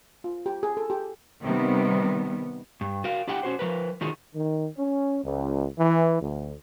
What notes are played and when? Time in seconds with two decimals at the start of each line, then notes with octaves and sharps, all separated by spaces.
0.24 F4
0.46 G4
0.63 G#4
0.77 A4
0.90 G4
1.43 C3 D#3 G3 B3
2.81 G2
3.04 F#4 A#4 F5
3.28 D4 E4 G4 F#5 G5
3.43 C#4 F#4 C5
3.59 F3 A#4 B4
4.01 D3 D#3 D#4 F4 F#4 G#4
4.35 D#3
4.77 C#4
5.23 C#2
5.79 E3
6.21 D2